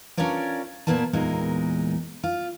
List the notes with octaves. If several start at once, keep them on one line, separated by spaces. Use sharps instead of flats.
C#4 D4 F4 A#4 C#5 D5
A#2 F3 A#3 B3 D5 A5
E2 A#2 G#3 D#4 A#4
F4